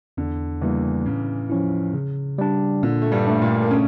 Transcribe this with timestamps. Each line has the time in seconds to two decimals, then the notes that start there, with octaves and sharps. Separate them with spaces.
0.17 E2 D3
0.62 E2 C#3 E3 G3 A#3
1.06 A2 C#3
1.50 F3 C#4 E4
1.94 C#3
2.38 G3 D4
2.83 A#2 D3
3.02 A3
3.12 G2 G3
3.27 A3 D4
3.41 A#2 A#3
3.62 A#3
3.70 C#3 C#4